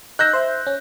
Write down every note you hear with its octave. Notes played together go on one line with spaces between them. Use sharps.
D#4 E6 F#6 G6 A#6
C5 E5
C#4